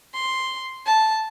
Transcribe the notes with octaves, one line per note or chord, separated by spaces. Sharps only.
C6
A5